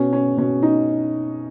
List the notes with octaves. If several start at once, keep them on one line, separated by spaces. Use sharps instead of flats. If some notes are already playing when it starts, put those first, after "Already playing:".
Already playing: B2 C#4
C#4
B2 C#4
D#4